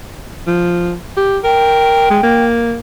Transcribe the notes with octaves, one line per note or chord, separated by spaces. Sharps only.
F3
G4
A#4 G5
G#3
A#3